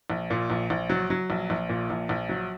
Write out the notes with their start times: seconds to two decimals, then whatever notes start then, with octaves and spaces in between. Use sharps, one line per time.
0.10 A#1
0.30 A#2
0.50 A#1
0.70 A#1
0.90 F#3
1.10 F#3
1.30 A#1
1.50 A#1
1.69 A#2
1.90 A#1
2.09 A#1
2.29 F#3